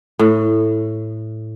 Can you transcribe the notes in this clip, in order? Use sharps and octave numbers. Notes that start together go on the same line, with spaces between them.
A2